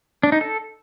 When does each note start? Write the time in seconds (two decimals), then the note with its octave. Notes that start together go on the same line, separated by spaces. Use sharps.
0.23 D4
0.32 D#4
0.41 A4